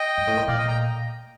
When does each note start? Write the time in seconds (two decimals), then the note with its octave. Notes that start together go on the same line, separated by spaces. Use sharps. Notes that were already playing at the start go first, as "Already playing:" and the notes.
Already playing: D#5 G5
0.17 G2
0.27 A2
0.37 A#2
0.47 A#2 D5 F5
0.58 D#5 G5
0.68 G5 A#5